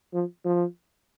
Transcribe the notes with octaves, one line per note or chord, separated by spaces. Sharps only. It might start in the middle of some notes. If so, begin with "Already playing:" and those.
F3
F3